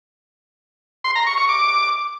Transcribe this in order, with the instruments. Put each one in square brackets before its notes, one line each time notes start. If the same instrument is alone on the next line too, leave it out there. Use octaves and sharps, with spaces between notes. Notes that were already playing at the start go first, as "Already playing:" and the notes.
[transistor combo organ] C6
A#5
C#6
C#6
D6